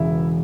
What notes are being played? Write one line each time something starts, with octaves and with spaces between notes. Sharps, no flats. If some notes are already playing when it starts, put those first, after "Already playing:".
Already playing: E1 E2 C#3 E4